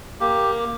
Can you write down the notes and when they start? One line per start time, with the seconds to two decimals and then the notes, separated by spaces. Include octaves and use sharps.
0.20 A#3 G4